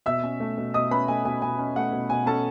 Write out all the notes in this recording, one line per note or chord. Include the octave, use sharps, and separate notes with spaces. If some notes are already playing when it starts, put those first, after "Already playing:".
B2 E5 E6
C#4
A3
B2
B2 D#5 D#6
C#4 B4 B5
A3 G#5
B2 G#5
B2 G#5
C#4
A3 F#5
B2
B2 G#5
C#4 A4 A5